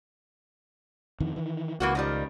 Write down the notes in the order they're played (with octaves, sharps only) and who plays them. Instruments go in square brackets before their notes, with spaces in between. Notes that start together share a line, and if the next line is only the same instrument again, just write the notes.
[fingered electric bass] F2 D#3 E3
D#3 E3
[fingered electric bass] C#2 [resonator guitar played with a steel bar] E3 A#3 F#4
[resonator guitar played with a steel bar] D#3 F3 G3